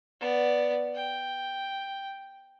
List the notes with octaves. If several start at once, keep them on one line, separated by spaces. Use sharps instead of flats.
B3 D5
G5